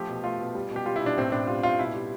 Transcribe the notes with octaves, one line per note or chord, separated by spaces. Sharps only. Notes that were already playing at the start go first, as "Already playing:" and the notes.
Already playing: F3 A3 G4
B2
A3 F4
B2
G3
B2 G4
G3 F4
E4
B2
D4
A2 C4
A2 D4
G3 F4
A2 F4
B2 E4
G3